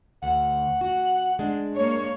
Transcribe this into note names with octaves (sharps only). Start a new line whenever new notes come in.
D2 F#5
F#4
G#3 D4
A#3 C#5